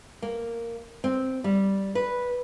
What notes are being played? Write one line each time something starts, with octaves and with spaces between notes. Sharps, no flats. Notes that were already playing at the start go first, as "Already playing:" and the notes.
A#3
C4
G3
B4